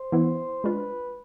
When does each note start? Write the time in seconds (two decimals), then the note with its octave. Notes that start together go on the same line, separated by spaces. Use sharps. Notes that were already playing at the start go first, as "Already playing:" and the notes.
Already playing: C5
0.12 E3 B3 E4
0.64 G#3 D4 F4 B4